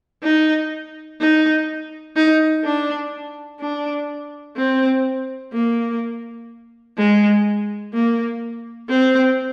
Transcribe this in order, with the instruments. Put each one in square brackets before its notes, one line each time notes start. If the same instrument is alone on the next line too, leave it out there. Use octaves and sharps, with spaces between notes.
[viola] D#4
D#4
D#4
D4
D4
C4
A#3
G#3
A#3
C4